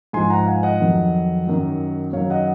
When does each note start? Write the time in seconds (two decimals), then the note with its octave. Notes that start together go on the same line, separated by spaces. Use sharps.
0.13 G#2 F3 G#5 C6
0.30 F#5 A#5
0.46 F5 G#5
0.63 D#5 F#5
0.80 F2 D#3 F#3
1.48 F#2 D#3 F#3
2.13 F#2 D#3 F#3 C#5 F5
2.30 D#5 F#5